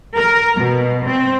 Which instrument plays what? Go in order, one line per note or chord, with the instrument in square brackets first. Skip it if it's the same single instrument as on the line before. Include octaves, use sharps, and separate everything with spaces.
[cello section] A#4
B2
C4